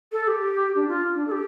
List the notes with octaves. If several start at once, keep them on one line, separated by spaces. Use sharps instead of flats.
A4
A4
G4
D4
F4
D4
A4
G4